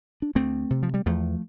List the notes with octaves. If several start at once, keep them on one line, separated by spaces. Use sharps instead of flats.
D4
D2 A3 C4
C3
F3
G3
E2 F3 A3